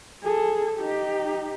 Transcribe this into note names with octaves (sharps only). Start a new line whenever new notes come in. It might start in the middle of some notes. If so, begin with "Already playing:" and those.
G#4 A4
D#4 G4